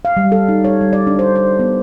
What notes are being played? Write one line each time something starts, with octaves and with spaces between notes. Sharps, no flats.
F5
G3
A4
D#4
C#5
G3
D5
D4
C5
C5
B3